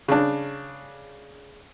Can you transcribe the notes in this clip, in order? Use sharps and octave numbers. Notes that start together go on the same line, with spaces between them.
C#3 D4